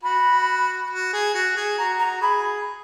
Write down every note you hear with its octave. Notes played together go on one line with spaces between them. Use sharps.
F#4 B5
F#4
G#4
F#4
G#4
F#4 A#5
A#5
G#4 B5